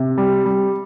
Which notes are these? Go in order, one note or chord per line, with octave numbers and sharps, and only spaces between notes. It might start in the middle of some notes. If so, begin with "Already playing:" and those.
Already playing: C3
G3
G3